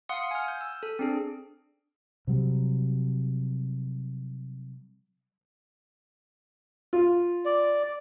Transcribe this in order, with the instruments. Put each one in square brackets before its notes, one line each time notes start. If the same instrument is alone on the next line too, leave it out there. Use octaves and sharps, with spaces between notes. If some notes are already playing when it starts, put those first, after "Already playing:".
[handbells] F5 F#5 C6 D#6 C#7
G#5 F6
G6
E6
A4
C4 D4 G#4
[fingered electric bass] C3 F#3 G3
[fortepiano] F4
[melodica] D5